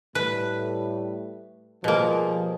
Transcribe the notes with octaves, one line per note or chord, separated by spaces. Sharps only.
A2 G3 A3 B4
B2 F3 G3 A#3 G#4